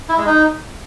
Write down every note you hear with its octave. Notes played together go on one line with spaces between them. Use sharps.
E4
G#3
D#4